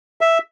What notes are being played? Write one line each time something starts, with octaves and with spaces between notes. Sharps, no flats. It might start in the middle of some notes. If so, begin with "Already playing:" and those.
E5